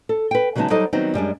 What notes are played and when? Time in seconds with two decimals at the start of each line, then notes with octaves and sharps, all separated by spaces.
0.09 A4
0.31 B4 G5
0.56 C#3 F#3 G#3 B3 D#4 A5
0.70 F#3 G3 D#4 A4 C5 D#5
0.93 D#3 F#3 G3 B3 C4 D#4
1.14 F#2 G3 G#3 D4